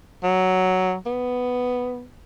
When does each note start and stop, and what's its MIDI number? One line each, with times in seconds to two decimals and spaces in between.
0.24 0.96 54
1.06 2.06 59